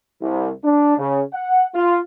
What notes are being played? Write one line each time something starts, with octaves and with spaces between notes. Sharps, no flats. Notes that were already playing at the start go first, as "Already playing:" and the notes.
C2
D4
C#3
F#5
F4